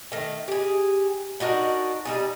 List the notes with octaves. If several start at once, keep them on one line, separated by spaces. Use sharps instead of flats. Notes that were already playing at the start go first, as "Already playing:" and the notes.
D#3 A3
G4 G#4
D4 D#4 F#4 A#4
G3 D#4 G#4